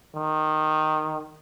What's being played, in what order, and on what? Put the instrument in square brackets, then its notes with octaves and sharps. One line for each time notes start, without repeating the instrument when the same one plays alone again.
[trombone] D#3